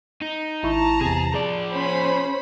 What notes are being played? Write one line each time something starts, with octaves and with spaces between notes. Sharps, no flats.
D#4
G#1 E4 A5 A#5 C#6
E2 C3 G#4
F3 G#4 D5
C#4 C5 B5